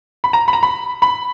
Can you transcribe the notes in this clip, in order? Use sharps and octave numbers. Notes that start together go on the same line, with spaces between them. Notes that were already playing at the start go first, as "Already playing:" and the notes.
B5
A#5
B5
A#5
B5
B5